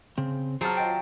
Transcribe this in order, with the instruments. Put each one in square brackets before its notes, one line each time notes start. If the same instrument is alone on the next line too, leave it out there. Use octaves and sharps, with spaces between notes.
[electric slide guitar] C#3 C4
[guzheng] F#3 [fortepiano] G#4 A5 F6 [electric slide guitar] C5
[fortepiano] F4 D#5 A5 [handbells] G5